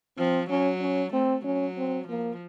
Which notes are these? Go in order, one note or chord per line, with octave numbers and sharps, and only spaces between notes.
F3 C4
F#3 C#4
C#4
A3 C4
F#3 C#4
C4
F3 A#3